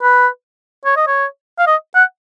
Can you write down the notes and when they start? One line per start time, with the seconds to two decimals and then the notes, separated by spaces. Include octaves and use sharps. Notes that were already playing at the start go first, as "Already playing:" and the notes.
0.02 B4
0.85 C#5
0.97 D#5
1.07 C#5
1.58 F5
1.67 D#5
1.95 F#5